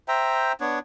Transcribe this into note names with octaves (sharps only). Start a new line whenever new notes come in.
C5 E5 G5 A#5
B3 D4 C#5